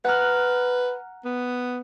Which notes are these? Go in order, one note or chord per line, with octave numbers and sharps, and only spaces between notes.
B4 F#5 A#5 F6
B3